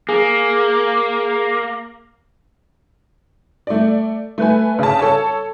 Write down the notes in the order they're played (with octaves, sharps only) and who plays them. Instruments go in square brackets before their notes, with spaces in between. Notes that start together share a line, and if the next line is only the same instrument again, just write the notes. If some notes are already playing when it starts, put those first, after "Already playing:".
[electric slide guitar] A#3 [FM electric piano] G#4
[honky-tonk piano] A3 D5
A3 B4 G#5
C#3 A5
A4 C#5 A5